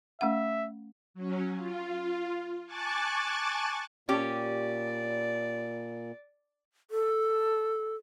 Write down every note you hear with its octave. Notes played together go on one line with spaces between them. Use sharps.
A3 C#4 E5 F#5
F#3 C#4
F4
G#5 A5 C#6 D6 F#6 A6
A#2 C#4 G4 D5
A4